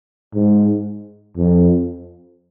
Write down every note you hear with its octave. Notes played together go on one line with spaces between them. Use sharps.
G#2
F2